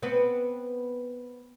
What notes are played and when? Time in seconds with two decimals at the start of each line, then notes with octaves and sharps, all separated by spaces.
0.02 B3 C4 B4